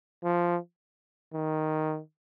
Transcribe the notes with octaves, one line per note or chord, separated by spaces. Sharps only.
F3
D#3